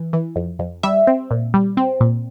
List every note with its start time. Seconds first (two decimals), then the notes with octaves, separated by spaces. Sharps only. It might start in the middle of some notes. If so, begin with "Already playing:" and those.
Already playing: E3
0.13 E3
0.36 F2
0.59 F2
0.83 G3 E5
1.07 C4
1.31 A#2
1.54 G3
1.77 C4
2.01 A#2